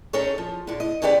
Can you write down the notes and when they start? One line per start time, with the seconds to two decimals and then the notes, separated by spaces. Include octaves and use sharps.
0.13 C#4 D#4 G#4 A4 C#5
0.38 F3
0.67 A2 D3
0.80 D#5
1.02 D3 C#4 E4 G4 B4 D5